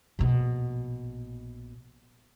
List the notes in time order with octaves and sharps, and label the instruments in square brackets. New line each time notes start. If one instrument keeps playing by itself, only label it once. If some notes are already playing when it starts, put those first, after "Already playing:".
[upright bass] A#1 B2